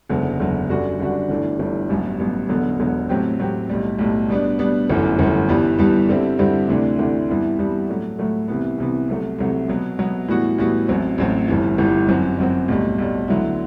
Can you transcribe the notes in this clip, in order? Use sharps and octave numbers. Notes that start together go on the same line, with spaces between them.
F#1 E2 D3 F#3
F#1 E2 D3 F#3
F#2 D3 G3 D4 F#4
F#2 D3 G3 D4 F#4
G1 G2 E3 A3 D4
G1 G2 E3 A3 D4
A1 G2 F#3 B3
A1 G2 F#3 B3
E1 E2 D3 F#3 B3
E1 E2 D3 F#3 B3
A2 F#3 C4 G4
A2 F#3 C4 G4
B1 A2 G3
B1 A2 G3
B2 G3 B3 D4
B2 G3 B3 D4
G1 F#2 E3 A3
G1 F#2 E3 A3
G2 E3 G3 B3
G2 E3 G3 B3
G2 D3 G3 C4 E4
G2 D3 G3 C4 E4
D2 C3 E3 A3 D4
D2 C3 E3 A3 D4
G2 E3 G3 B3 E4
G2 E3 G3 B3 E4
A2 F#3 A3
A2 F#3 A3
C2 C3 E3 B3
C2 C3 E3 B3
C2 C3 F#3 A3
C2 C3 F#3 A3
B2 F#3 B3
B2 F#3 B3
A2 E3 G3 B3 F#4
A2 E3 G3 B3 F#4
A1 A2 F#3 C4
A1 A2 F#3 C4
G1 G2 E3
G1 G2 E3
F#2 F#3 C4
F#2 F#3 C4
B1 A2 G3
B1 A2 G3
D2 D3 F#3 B3 E4